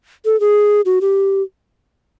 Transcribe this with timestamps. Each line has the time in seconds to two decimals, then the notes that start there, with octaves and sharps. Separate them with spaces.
0.25 A4
0.40 G#4
0.85 F#4
1.01 G4